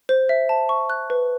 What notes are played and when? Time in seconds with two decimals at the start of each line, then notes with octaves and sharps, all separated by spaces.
0.09 C5
0.29 E5
0.49 A5
0.69 C#6
0.90 F#6
1.10 B4